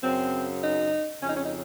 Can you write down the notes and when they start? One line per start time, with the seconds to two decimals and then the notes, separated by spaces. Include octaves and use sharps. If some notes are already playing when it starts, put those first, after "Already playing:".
0.03 F#2 C#3 C4
0.63 D#4
1.22 F2 C#3 C#4
1.29 D#4
1.37 C#4
1.45 D#4